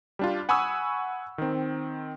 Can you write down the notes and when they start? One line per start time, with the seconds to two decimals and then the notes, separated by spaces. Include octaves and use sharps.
0.19 G3 D4 F4
0.49 F#5 G#5 B5 C#6 D#6 E6
1.38 D#3 C4